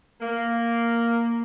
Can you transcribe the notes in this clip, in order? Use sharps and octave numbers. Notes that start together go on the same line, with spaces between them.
A#3